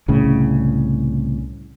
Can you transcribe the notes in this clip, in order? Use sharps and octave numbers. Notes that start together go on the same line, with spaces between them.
C2 A2 C#3